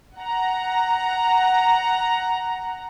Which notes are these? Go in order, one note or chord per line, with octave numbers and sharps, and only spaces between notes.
F#5 A#5